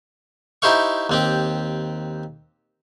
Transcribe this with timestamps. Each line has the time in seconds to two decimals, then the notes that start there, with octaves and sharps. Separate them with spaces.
0.62 D#4 E4 G4 C5 F5 C#6
1.09 D#2 C4 G4